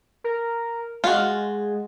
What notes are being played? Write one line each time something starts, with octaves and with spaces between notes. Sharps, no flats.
A#4
G#3 F4 F#4